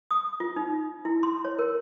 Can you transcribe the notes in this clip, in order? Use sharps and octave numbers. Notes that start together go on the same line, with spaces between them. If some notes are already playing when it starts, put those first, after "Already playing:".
D#6
F4
D#4
E4
C6
C#5
A#4